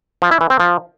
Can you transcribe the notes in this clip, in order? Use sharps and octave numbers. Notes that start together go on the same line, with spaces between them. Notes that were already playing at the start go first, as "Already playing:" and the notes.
F3
E4
E3
C4
F3